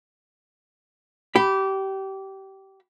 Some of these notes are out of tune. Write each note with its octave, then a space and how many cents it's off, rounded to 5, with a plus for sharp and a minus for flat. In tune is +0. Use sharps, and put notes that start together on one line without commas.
G4 -25 B5 +0